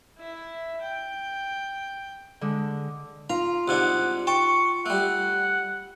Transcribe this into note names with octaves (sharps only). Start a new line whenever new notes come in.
E4 E5
G5
D3 G#3
F4 A#5
C2 G#2 D4 F#5
G5 A5 C#6
G3 A3 F#5